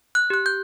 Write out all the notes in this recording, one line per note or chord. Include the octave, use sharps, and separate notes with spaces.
F#6
G4 F#6
G6